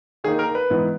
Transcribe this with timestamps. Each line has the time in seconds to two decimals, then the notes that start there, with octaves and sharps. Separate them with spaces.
0.24 D#3 A#3 D#4 G#4
0.39 A#4
0.55 B4
0.70 G#2 E3 B3